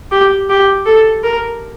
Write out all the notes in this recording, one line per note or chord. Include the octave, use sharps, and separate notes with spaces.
G4
G4
A4
A#4